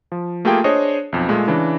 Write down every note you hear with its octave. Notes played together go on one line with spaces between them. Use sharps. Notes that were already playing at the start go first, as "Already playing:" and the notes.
F3
A3 A#3 F4 G4 G#4 G5
D4 G#4 C5 C#5 D#5
B1 F2
A#2 G#3 A3
C#3 E3 D4